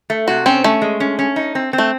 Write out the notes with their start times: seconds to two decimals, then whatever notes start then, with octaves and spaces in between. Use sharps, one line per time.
0.10 A3
0.28 C3 F#4
0.46 C4 C#4
0.64 A3 C#4
0.82 G#3
1.00 C#4
1.19 C#4
1.36 D#4
1.55 C4
1.73 C4
1.78 A3